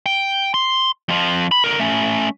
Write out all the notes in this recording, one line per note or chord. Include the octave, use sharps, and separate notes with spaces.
G5
C6
F2 F3
B5
D3 A#4
A3 C#4